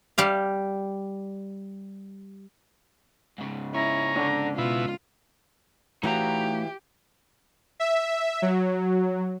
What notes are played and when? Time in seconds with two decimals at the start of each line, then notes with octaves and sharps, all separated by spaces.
0.18 G3 G4 F5
3.38 G#2 C#3
3.74 C#4 E4 A#5
4.14 D3
4.58 B2 E4 F4
6.03 E3 A3 D#4 F#4 G4 C#5 F5 A#5
7.80 E5
8.42 F#3